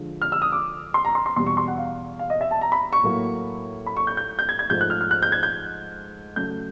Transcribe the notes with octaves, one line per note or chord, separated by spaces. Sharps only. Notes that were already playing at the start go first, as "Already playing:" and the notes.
Already playing: D3 F3 G#3
F6
E6
D#6
D6
C6
A#5
C6
C6
E2 B2 G3 C6
C#6
C6
F#5
F5
F5
D#5
E5
A5
A#5
B5
C#6
A2 F#3 A#3
B5
C#6
G6
G6
G6
G#6
G#6
G#2 F3 A3 G6
F#6
F6
F6
F#6
G6
G#6
G6
C#3 F#3 A3 G6